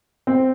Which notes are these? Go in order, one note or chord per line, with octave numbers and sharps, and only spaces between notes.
C4